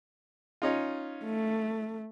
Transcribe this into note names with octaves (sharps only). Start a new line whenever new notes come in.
C#4 D#4 F4
A3